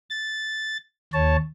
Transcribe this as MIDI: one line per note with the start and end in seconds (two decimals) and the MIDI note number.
0.10 0.77 93
1.14 1.37 39
1.14 1.37 73
1.14 1.37 81